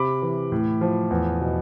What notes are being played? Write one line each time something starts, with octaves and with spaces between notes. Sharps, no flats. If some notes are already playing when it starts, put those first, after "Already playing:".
Already playing: C3 B5 D6
E3
A2
F3
E2
B2